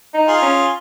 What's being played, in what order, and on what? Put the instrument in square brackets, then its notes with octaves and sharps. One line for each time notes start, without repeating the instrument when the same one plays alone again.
[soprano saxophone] D#4
[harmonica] F4 G#4
[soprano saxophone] C#4